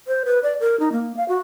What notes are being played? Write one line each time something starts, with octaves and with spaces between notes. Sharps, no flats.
C5
B4
D5
A#4
D#4
A#3
F5
F#4